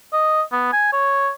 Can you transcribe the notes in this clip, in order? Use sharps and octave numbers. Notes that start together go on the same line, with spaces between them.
D#5
B3
G#5
C#5